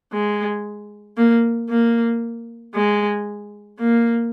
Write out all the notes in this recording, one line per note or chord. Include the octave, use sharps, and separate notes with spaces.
G#3
A#3
A#3
G#3
A#3